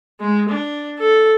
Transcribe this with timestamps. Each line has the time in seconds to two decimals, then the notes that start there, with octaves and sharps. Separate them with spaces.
0.20 G#3
0.49 D4
1.00 A4